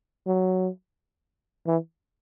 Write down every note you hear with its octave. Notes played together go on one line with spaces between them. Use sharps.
F#3
E3